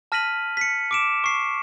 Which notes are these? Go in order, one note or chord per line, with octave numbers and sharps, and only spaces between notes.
A5 F6 A#6 B6 D#7 F#7
B6 C#7
D6 D7 E7
C#6 C7